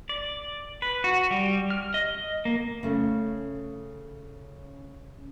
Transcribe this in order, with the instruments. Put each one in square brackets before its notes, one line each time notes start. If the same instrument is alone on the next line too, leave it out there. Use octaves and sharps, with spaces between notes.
[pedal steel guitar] D5
B4
F#4
G3
F6
D#5
A#3
[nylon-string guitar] C#3 A3